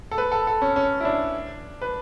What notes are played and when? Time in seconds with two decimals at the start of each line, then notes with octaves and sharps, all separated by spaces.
0.11 A4
0.18 B4
0.32 A4
0.47 A4
0.62 C#4
0.76 C#4
1.00 E4
1.05 D4
1.81 B4